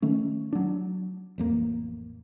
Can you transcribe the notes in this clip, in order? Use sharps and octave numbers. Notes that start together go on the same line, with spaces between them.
D#3 A3 C#4
F#3 D4
A1 F2 A#3